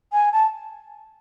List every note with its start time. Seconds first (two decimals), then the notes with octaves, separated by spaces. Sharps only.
0.12 G#5
0.32 A5